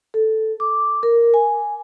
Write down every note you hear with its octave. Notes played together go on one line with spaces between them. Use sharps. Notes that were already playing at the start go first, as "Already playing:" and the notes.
A4
D6
A#4
G#5